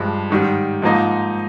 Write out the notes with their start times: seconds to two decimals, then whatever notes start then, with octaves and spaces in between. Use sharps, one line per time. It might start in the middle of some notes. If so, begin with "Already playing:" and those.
Already playing: G2 F3 G#3
0.30 G#2 D#3 G3
0.82 G#2 F3 A#3 D#4